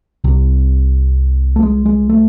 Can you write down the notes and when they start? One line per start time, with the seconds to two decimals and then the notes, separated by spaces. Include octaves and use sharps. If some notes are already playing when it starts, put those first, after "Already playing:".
0.24 C2 C3
1.56 A3
1.63 G#3
1.86 G#3
2.09 A3